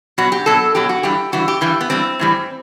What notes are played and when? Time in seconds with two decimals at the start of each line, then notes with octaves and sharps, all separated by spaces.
0.18 B2 F#3 F#4
0.32 G4
0.46 B2 F#3 A4
0.75 B2 F#3 G4
0.89 F#4
1.03 G2 E3 G3 G4
1.32 G2 E3 G3 F#4
1.48 G4
1.61 G2 E3 G3
1.81 B3
1.90 G2 E3 G3 C4
2.19 A2 E3 G3